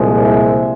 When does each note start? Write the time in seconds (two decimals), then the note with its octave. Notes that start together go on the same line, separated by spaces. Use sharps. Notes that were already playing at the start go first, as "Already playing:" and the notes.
Already playing: C2 A#2 F3 G#3
0.21 E5